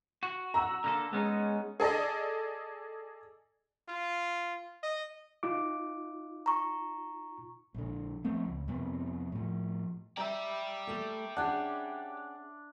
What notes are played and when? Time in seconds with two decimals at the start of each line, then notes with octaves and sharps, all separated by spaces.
0.23 F#4
0.54 A#5 E6
0.84 D3 A#3 A4
1.13 G#3 B3 C#4 D#4
1.80 G#4 A4 D5 D#5
3.88 F4
4.83 D#5
5.43 D#4 F4 D6
6.46 A#5 C#6
7.74 A#1 D3
8.24 F3 A3 B3 C4
8.46 C#2
8.68 F2 C3 B3
9.32 A2 F3
10.17 G4 D5 E5 A#5
10.87 A3 A4
11.37 C#4 D4 G#4 F#5